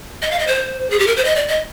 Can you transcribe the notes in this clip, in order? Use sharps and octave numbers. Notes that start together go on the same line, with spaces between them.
D#5
F5
D#5
C5
G#4
G4
A#4
C5
D#5
D5
D#5